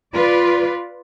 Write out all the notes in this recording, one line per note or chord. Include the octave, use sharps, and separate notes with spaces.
F4 B4 D5